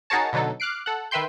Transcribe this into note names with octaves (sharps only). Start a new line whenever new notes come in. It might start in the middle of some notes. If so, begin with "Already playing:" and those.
D#4 F#4 G#4 A#4 C#5 A5
B2 D3 F#3 D#4 A4
D6 F6 F#6 C7 D7
A4 F#5
D#3 B4 E5 G5 C6 G6